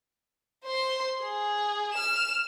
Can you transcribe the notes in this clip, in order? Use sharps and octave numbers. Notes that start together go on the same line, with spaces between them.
C5 C6
G#4
F6 E7